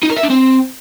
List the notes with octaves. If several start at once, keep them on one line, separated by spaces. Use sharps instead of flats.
D#4
A#4
E5
D4
C4